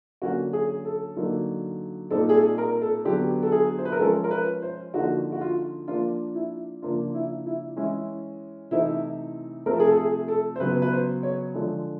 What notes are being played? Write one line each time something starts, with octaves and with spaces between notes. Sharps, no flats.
D3 F#3 A#3 C#4 F#4
G#4
A4
D3 F#3 A#3 D#4
A#2 G3 C4 D#4 A4
G#4
A4
A#4
A4
D3 F#3 B3 G4
A4
G#4
C5
B4
A#4
F3 G#3 C#4 A4
A#4
B4
C5
D3 F3 A#3 D#4 F#4
F#4
F4
F3 A#3 D4 F4
E4
C#3 F3 A#3 D4 F4
E4
E4
E3 G#3 C#4 E4
C3 E3 A3 C4 D#4 E4
C3 F3 A3 C4 A#4
A4
G#4
A4
G#4
A4
C5
C#3 F#3 B3 B4
B4
C5
C#5
D3 F3 G#3